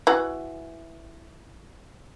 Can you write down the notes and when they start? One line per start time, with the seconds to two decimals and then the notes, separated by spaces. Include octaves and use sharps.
0.07 E3 F#4